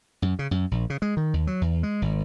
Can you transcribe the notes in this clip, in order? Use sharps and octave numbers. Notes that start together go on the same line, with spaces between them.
F#2
C#3
F#2
A#1
C#3
G#3
D#3
D#2
F#3
E2
G#3
G#1